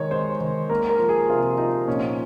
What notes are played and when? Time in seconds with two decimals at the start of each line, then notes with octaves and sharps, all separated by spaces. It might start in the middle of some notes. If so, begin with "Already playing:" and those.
Already playing: D#3 G#3 C#5
0.11 G#3 C5
0.41 D#3
0.70 A#3 A#4
0.89 A#4
0.99 F3
1.09 G#4
1.29 C3 F4
1.58 F3 D#4
1.87 A#2 C#4